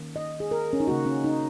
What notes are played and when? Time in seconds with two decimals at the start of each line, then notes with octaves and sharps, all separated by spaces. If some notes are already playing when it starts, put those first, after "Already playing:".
Already playing: D#3 A#3 C#4
0.16 D#5
0.40 G#4
0.51 A#4
0.73 C#4
0.80 D#4
0.88 C#3 A#3 C#4 F#4
1.06 C#4
1.24 D#4